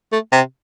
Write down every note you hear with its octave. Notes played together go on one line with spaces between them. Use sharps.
A3
C3